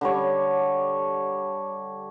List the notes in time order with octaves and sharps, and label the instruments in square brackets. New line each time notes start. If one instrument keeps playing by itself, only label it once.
[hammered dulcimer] D3 G3 C#5